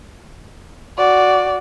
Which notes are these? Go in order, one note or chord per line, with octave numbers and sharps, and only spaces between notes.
F#4 D5